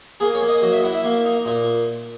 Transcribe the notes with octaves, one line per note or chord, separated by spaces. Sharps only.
A#3 G#4
C#5
A#3
D#5
F#3 D#5
E5
E4 F#5
E5
A#3
D#4
A#2